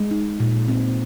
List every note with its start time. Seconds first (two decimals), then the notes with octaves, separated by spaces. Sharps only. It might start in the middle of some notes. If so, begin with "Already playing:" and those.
Already playing: G#3
0.11 D#4
0.40 A#2
0.68 C4